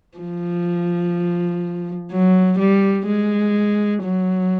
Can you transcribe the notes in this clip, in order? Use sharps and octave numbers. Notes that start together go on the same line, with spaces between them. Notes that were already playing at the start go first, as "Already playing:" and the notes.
F3
F#3
G3
G#3
F#3